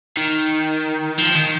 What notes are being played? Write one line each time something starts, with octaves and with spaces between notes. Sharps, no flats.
D#3
F3
D#3